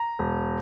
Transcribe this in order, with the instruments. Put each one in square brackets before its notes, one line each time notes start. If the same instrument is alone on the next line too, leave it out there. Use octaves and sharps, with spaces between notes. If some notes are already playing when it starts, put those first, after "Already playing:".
Already playing: [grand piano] A#5
E1